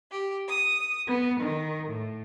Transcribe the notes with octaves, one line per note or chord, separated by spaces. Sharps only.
G4
D#6
B3
D#3
A2